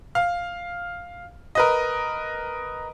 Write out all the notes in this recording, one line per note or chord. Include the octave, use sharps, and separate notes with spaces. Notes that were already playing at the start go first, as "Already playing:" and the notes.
F5
A#4 B4 D#5